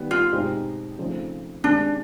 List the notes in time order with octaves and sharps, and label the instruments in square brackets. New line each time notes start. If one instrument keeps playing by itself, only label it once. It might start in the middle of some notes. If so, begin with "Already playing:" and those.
Already playing: [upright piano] D#3 G3 B3
[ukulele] F4
[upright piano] B2 G#3 C4 D#4 G4
C#3 F3 A3 C4 D#4
[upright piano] C3 D#3 G#3 [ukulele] D4